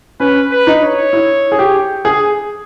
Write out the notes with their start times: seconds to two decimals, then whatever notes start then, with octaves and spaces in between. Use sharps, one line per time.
0.20 C#4 B4
0.51 B4
0.67 D#4
0.82 C#5
1.13 E4
1.52 G#4
1.59 G4
2.05 G#4